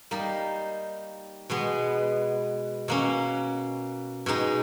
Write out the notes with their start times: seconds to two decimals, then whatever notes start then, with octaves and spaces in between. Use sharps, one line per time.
0.11 G3 A#3 D#4
1.50 B2 G#3 B3
2.88 B2 A#3 C#4
4.26 B2 G#3 D#4